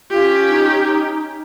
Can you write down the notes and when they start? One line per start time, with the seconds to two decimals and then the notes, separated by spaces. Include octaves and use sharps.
0.10 C#4 F4 G4
0.49 D#4